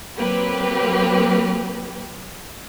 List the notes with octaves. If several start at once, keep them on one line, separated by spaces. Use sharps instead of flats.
F#3 A#3 C4 G4 B4